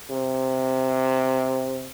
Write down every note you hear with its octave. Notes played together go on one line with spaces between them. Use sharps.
C3